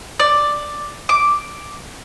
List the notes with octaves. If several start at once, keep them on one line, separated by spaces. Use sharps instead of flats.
D5
D6